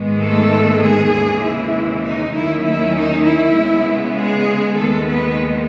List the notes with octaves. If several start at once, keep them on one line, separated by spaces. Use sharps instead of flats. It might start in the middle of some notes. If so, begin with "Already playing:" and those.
Already playing: G#2 D#3 G#3 B3
A3 A4
G#3 G#4
D#2 C#3 E3 G#3
E4
D#4
D#2 D#3 F#3 A3 C#4 E4
E4
D#4
E4
C#3 G#3 B3
G#3 G#4
D#2 D#3 G#3 A3 B3 A4
B3 B4